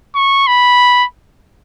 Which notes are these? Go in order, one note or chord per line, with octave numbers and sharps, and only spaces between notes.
C#6
B5